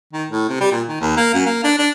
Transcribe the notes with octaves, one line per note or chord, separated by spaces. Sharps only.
D#3
A2
C3
G3
A#2
D#3
D#2
A#3
F#2
A#3
D4
D4